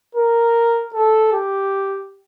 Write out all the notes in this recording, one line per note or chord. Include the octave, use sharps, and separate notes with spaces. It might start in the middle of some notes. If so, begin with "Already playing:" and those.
A#4
A4
G4